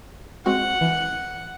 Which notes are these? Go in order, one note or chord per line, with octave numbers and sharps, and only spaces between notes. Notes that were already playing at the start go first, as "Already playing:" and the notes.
G#3 C4 F#4 F#5
E3